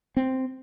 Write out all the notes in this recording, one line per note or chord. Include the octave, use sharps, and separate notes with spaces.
C4